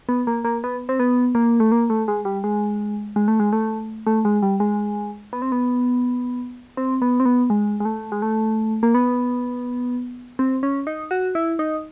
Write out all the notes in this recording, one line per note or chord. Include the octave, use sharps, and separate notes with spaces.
B3
A#3
A#3
B3
C4
B3
A#3
A3
A#3
A3
G#3
G3
G#3
G#3
A3
G#3
A3
A3
G#3
G3
G#3
B3
C4
B3
C4
B3
C4
B3
G#3
G#3
A3
G#3
A3
A#3
B3
C4
C#4
D#4
F#4
E4
D#4